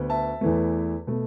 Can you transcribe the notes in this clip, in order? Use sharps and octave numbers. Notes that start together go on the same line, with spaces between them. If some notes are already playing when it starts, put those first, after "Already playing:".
Already playing: D2 D3 B3
E5 A5
E2 E3 A3
B2 A3